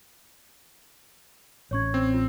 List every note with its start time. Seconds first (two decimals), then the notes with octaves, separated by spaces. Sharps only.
1.71 A1 C#4 C#5 C#6 G#6
1.94 C4
2.14 F4